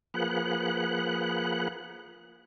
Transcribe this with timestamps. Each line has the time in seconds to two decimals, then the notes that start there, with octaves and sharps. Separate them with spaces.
0.14 F3 A#3 G#4 B4 F#5 F#6